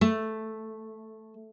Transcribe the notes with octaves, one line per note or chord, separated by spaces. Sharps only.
A3